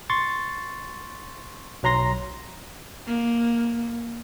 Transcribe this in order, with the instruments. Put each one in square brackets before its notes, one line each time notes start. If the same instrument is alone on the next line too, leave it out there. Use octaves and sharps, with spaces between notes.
[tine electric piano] C6 C#6 A6
B1 F#3 A#5 C6 A#6
[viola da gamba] A#3